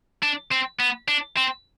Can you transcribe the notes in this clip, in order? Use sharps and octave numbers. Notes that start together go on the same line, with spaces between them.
D4
C4
B3
D4
C4